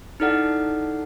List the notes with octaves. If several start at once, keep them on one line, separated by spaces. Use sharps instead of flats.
D#4 E4 A4 D5 F#5